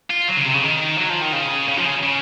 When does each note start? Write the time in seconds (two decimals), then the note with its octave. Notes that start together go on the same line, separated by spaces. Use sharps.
0.10 F4
0.28 F#3
0.37 C#3
0.45 C3
0.54 C#3
0.63 D#3
0.98 F#3
1.09 F3
1.21 D#3
1.33 C#3
1.68 C#3
1.77 F3
1.85 C#3
2.03 C#3